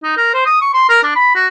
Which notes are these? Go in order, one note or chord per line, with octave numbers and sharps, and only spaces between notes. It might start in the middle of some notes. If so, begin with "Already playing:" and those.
D#4
A#4
C5
D#6
C#6
C6
A#4
D4
B5
F#4